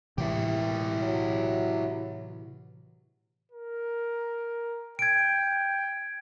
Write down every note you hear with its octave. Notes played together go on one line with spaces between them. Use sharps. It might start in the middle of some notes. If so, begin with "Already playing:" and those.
A2 C3 E3 E4 G4
F#3
A#4
G5 G#6 D7